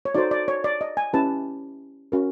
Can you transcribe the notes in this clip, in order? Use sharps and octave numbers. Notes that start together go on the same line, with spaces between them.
C#5
D#4 F#4 A4 C5 D5
D5
C#5
D5
D#5
G#5
C#4 E4 G4 B4 A5
C#4 F#4 A#4